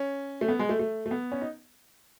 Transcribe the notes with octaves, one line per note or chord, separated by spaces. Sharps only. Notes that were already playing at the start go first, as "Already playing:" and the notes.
Already playing: C#4
A3
B3
G#3
A3
A3
A3
B3
C#4
D#4